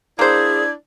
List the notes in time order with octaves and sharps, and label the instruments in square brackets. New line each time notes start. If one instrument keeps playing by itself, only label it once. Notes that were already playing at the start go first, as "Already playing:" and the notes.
[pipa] A#3 C5 [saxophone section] D4 E4 D5 [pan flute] G#4 [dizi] G#6